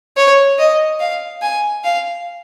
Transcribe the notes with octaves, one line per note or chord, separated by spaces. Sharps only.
C#5
D#5
F5
G#5
F5